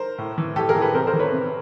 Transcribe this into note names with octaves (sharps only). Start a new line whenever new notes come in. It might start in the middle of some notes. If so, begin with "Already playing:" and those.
Already playing: A#4 C5
A2
E3
A2 G4 A4
G#4 A#4
E3
A4 B4
C3 A#4 C5
A#4 C5
E3
B4 C#5
C3